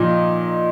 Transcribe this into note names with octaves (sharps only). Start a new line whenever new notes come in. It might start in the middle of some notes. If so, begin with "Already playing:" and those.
Already playing: A#2 F3 D#4